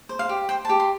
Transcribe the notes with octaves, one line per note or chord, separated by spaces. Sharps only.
C5
F5
G4
C5 G5
A5
G4
C6